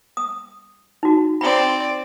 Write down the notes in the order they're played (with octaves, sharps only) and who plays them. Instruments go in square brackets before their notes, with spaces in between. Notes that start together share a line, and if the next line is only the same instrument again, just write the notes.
[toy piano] D#6
D#4 F#4
[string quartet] C4 D5 [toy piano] B5